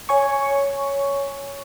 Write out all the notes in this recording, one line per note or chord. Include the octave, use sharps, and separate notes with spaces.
C#5 G#5 C#6